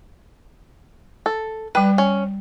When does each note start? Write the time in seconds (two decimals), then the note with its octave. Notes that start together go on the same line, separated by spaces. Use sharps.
1.26 A4
1.75 G3 B4 G5
1.98 C#4